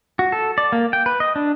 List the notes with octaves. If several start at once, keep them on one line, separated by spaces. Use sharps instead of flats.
F#4
A4
D5
A#3
G5
B4
D#5
D4